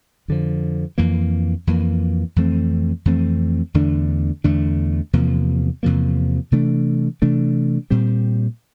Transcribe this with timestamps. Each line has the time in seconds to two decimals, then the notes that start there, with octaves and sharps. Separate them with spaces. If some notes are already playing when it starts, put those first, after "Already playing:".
0.28 F2 D3 F3
0.98 F2 E3 A#3
1.67 F2 E3 A#3
2.36 F2 E3 A3 C4
3.05 F2 E3 A3 C4
3.74 E2 D3 A3 D4
4.44 E2 D3 A3 D4
5.13 E2 C3 F3 A#3
5.83 E2 C3 F3 A#3
6.52 C3 E3 A3 D4
7.22 C3 E3 A3 D4
7.91 A#2 G3 C4